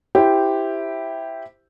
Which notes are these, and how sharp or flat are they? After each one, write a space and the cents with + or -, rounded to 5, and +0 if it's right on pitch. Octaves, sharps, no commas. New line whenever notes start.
E4 +0 G4 +0 C5 -10